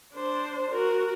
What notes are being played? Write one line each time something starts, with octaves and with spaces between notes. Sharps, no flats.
D4 C5
F#4 A#4